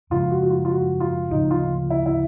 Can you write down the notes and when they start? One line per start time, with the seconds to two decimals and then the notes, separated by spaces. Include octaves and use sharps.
0.10 F#2 C#3 F3 G#3 F4
0.30 F#4
0.42 F#4
0.50 F4
0.65 F4
0.70 F#4
1.00 F4
1.30 D2 C#3 F3 A#3 D#4
1.51 F4
1.90 E4
2.06 E4